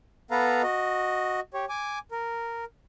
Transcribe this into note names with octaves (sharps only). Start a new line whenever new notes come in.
B3 A4 B4 F5 A#5
F#4 D#5
G4 C#5
G#5 D6
A#4